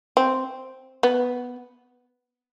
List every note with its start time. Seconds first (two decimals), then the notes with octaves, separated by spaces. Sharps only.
0.17 C4
1.03 B3